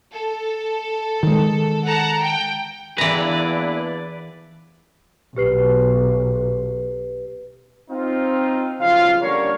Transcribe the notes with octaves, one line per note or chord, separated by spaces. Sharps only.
A4
D#3 G#3
F#5 A5 A#5
G5
E2 E3 A#3 D4 E4 B4 D5 A#5
B1 G4 B4 C7
C4 D#4 F4
B1 C#3 F3 F4 F5
D3 G3 A#3 C#4 A#4 C#5